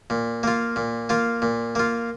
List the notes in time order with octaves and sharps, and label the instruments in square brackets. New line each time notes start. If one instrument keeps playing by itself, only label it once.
[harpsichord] A#2
A#3 F4
A#2
A#3 F4
A#2
A#3 F4